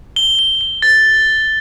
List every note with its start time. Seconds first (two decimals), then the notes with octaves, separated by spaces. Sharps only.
0.16 G7
0.39 G7
0.61 G7
0.82 A6